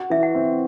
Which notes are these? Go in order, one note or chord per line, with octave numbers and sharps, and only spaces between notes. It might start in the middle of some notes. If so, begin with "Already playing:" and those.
Already playing: F#4
E3 E5
F#5
C4